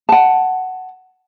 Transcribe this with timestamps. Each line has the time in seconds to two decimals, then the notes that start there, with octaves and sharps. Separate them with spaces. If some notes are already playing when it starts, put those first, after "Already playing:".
0.09 F#5 A5